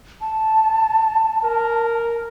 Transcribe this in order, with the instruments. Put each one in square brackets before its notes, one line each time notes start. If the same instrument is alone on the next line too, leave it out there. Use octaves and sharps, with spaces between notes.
[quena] A5
[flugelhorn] A#4